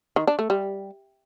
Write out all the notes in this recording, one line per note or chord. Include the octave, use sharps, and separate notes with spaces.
D#3
D4
A3
G3